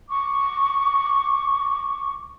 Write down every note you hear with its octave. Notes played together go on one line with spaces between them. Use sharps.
C#6 D6